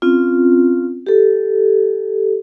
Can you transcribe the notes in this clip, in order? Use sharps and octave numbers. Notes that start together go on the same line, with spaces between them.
C4 C#4 F4
G4 A4